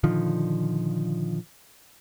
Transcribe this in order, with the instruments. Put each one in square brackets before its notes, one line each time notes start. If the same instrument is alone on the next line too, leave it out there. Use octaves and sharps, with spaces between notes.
[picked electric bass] A#2 D3 D#3 F3